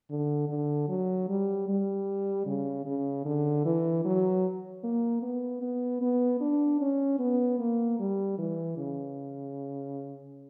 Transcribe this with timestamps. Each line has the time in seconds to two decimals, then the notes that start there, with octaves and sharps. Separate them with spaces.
0.10 D3
0.49 D3
0.88 F#3
1.29 G3
1.68 G3
2.46 C#3
2.86 C#3
3.25 D3
3.65 E3
4.05 F#3
4.84 A#3
5.22 B3
5.62 B3
6.02 B3
6.40 D4
6.81 C#4
7.19 B3
7.59 A#3
7.99 G3
8.38 E3
8.78 C#3